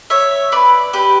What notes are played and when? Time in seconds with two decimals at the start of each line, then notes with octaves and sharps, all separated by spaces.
0.10 C#5 E5
0.52 B4 D5
0.93 G4 B4